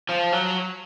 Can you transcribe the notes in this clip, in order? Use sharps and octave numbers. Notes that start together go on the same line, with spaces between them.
F3
F#3